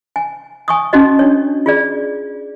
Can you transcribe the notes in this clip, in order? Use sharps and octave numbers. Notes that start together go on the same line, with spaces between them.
G#5
G#5 C#6 D#6
C#4 D#4 F#4 D#5
D4 C#5
F4 G#4 D5